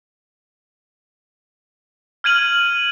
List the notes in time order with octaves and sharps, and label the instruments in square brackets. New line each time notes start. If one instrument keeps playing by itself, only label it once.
[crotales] F6 G#6 D#7 F#7